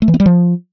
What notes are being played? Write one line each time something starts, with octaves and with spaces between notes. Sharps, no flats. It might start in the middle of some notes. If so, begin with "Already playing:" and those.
A3
E3
B3
G3
F3